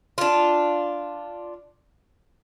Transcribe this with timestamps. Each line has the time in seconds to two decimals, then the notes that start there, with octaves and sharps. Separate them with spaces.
0.18 D4 F4